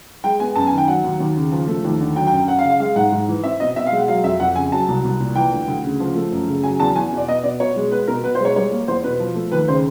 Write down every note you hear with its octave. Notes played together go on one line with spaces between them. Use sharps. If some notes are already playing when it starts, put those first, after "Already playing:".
G#3 G5
B3 G#5
F#2 A5
G#5
D#3
G5
F#3 F#5
D#2
D#2
C#3
F3
A3
D#2
D3
F#3 G5
G5
F#2
G5
F#2 F#5
F5
C#3
F5
G#3 F5
G#2 F#5
G#2
E3
C4 E5
B2 D#5
B2 E5
F5
G#3
F#5
F#3 F5
F2 E5
F2 F#5
C#3 G#5
F#3 A5
C2
C2
A#2
E3 G5
D2
D2
C#3
F3
A3
F#2
C#3
F#3 G#5
E2 A5
E2 G#5
B2
D5
B3 D#5
B2 D5
B2 C#5
G#3
B3 B4
B2 A#4
B2 B4
C5
G#3 C#5
G3 C#5
A#3
E2 C5
B2 B4
F3
A3
D#2 B4
C#3 C5